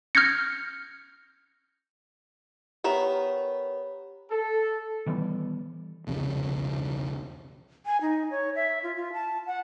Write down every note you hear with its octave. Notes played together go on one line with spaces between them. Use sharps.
F6 G6 G#6 A#6 C#7
B3 G4 A#4 C#5 E5
A4
D#3 E3 G3 B3
E1 C2 F2 C#3
G#5
D#4
C#5
E5
F4
F4
A5
F#5